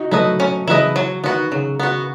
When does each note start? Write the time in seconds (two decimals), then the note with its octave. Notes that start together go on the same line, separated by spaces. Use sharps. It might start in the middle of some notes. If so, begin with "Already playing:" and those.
Already playing: D#4 F#4
0.11 F#3 A3 E4 B4 D#5
0.40 C#4
0.68 C#3 E3 E4 B4 D#5
0.96 F#3
1.24 D#3 B3 F#4
1.52 C#3 F#3
1.80 B3 F#4